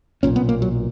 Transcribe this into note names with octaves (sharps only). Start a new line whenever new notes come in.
B1 A#2 C#4
B3
A#3
F#3